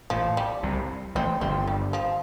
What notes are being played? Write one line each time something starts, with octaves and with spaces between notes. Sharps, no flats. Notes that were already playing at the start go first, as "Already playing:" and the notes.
A1 A2 F3
G3
C2 C3
A1 A2 C4
G1 G2 C4
G3
F3